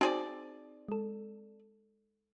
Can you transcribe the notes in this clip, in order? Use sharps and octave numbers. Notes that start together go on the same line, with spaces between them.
C4 D#4 F#4 G#4 C5 D5
G#3 A4